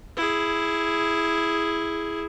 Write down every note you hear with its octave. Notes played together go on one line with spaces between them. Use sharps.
E4 G#4